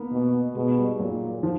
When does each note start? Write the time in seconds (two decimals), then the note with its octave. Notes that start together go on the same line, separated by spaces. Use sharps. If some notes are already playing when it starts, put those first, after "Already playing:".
Already playing: A#3 B3
0.12 B2
0.56 B2 G#3
0.78 G3
0.99 A#2 F#3
1.43 F3